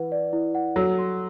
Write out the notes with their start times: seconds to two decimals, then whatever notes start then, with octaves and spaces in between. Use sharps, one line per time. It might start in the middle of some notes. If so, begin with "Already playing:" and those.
Already playing: E3 E4 B4 F#5
0.12 D5
0.33 E4
0.55 F#5
0.76 F#3 A4
0.98 C6